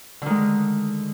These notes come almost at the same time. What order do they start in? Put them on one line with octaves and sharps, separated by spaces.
D3 D#3 G#3